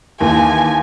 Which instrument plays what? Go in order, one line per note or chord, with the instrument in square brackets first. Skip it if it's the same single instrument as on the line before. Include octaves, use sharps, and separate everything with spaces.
[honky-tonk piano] D#2 E3 [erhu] G#5